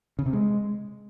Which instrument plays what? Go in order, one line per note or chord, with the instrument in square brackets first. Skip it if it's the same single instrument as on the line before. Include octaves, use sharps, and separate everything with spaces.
[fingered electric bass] C#3
C3
G#3